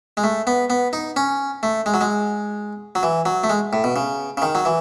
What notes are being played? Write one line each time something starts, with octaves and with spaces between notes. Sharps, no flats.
G#3
A3
B3
B3
D#4
C#4
A3
G#3
F#3
G#3
F#3
E3
F#3
A3
G#3
A2
B2
C#3
C#3
D#3
F#3
E3